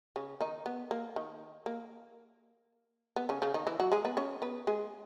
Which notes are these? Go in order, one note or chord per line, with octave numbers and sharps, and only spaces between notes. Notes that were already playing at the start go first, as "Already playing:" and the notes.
C#3 C#4
D#3 D#4
B3
A#3
D#3
A#3
B3
C#3 C#4
C#3 C#4
D#3 D#4
E3 E4
F#3 F#4
G#3 G#4
B3 B4
C#4 C#5
B3 B4
G#3 G#4